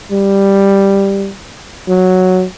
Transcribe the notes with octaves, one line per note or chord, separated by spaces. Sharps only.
G3
F#3